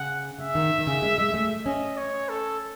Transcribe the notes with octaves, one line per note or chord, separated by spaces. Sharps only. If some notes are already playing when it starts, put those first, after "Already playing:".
Already playing: C#3 F#5
C#3 E5
D#3
D#3
C#3
G#3
G#3
A3
C#4 D#5
C#5
A4